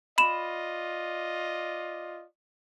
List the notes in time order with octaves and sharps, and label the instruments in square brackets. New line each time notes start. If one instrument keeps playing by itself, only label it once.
[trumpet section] F4 D5 D#5 [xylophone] B5 E7